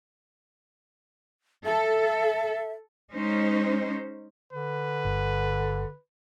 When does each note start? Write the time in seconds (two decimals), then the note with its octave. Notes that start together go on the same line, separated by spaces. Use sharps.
1.65 A4 E5
3.13 G#3 C#4 D#4 C5
4.53 D3 B4
5.05 G1